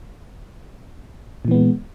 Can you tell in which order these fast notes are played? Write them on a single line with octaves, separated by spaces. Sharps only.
A#2 E3 B3 G#3